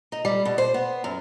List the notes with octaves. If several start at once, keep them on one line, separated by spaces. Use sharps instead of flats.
D#4
G3
B2
C5
B3
F#2